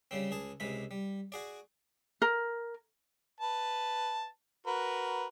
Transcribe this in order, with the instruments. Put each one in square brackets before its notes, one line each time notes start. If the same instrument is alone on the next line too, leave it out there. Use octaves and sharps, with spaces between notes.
[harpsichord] C#3 G3 C4
C#2 G#4 A5
C#2 C3 G#3 B5
G3
F#4 G#4 D5
[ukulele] A#4
[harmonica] B4 A5
F#4 A#4 B4